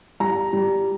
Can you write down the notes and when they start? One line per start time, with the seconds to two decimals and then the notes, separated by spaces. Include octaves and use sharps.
0.20 G3 A#5
0.53 G3